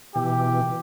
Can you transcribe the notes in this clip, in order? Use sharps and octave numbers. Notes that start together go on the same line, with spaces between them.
B2 E3 G4